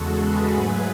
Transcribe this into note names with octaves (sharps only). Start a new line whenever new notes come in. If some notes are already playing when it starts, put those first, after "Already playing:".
Already playing: E2 C#3 G#3 F#4 A4
G#4 B4
G#2 F#3 A3